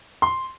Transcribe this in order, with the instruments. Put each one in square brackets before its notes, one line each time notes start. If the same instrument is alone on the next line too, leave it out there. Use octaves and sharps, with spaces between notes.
[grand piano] C6